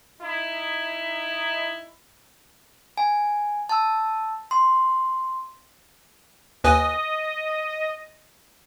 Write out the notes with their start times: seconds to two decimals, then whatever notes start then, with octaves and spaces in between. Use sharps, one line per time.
0.21 D#4 E4
2.98 G#5
3.69 A5 E6
4.51 C6
6.64 D#2 B4 D#5 G#5